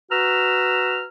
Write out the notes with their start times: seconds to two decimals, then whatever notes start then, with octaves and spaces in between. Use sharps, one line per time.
0.11 F#4 B4 A#5 E6 F6